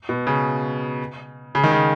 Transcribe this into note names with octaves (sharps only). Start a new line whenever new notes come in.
B2
C#3
C#3
D#3
C#3